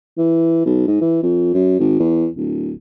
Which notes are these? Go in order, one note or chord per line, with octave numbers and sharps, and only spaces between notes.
E3
B1
G#2
E3
F2
F#2
G#1
E2
D1